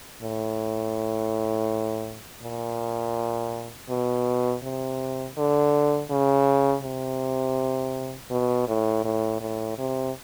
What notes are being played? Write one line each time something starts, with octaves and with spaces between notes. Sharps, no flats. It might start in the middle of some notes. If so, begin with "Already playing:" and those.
A2
A#2
B2
C3
D3
C#3
C3
B2
A2
A2
A2
C3